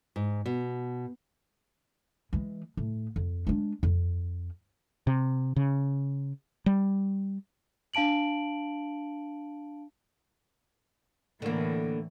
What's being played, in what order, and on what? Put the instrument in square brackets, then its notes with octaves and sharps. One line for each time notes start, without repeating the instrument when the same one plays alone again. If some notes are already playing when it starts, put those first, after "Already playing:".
[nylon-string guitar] G#2
B2
[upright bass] E3 G#3
A2
F2
G#3 D4
F2
[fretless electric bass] C3
C#3
G3
[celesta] D4 F5 A5 D7 F#7
[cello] A2 E3 [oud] D3 A#3